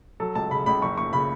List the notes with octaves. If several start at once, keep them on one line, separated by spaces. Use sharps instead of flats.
F#3 A4
C#2 A5
C#3 B5
C#2 B5
F#1 C#6
F#1 C#6
C#3 B5